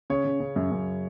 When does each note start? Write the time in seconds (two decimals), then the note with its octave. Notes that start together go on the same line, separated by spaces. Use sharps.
0.10 C#3 C#5
0.25 C#3
0.40 C#3
0.56 F#2
0.71 F#2